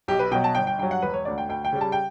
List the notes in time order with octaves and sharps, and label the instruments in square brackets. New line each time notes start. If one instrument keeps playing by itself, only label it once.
[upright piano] B1 G4
B4
B2 F#3 G5
A5
G1 G5
G5
G2 F#3 G5
F#5
E1 B4
C#5
D2 D3 D5
G5
D2 G5
G5
C#3 G3
A5
G5